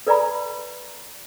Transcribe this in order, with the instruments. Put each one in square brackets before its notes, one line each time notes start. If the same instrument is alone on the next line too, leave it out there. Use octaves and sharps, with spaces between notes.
[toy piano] A4 B4 D5 G#5 A#5 B5